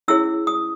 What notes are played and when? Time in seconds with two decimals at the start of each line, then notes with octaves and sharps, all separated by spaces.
0.08 C#4 E4 G#4 C#5 E6
0.47 D#6